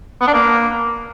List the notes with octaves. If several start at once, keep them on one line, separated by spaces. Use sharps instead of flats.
B3
D4
A#3